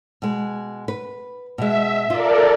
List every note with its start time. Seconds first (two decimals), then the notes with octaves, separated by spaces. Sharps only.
0.22 B2 G#3
0.88 B4
1.58 B2 G#3 E5
2.10 F4 A4 A#4 D5